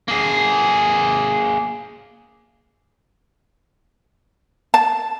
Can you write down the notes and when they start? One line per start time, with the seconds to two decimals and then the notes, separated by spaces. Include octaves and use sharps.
0.08 A#3 G#4
4.74 A5